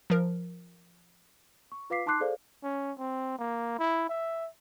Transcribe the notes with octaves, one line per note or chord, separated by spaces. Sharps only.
F3 A#4
C#6
F4 B4 F5 D6 B6 C7
D#4 A5 C6 D6 F#6 C7
G#4 A4 C5 D5 F5
C#4
C4
A#3
E4
E5